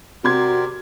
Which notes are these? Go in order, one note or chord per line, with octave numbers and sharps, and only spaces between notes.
C3 F#4 G4 A#4 D5 C6 G#6